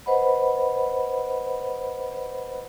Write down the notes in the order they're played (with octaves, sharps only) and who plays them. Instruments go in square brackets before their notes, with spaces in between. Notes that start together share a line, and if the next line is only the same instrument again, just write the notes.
[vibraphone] B4 C5 D#5 F#5 B5